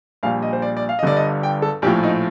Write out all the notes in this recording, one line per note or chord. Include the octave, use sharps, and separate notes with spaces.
A#1 A#2 G3 F5
D#5
C5
D5
D5
F5
D#5
G1 G2 D3 G3 D5
D#5
G5
A4
A#1 A2 F3 G4
D#4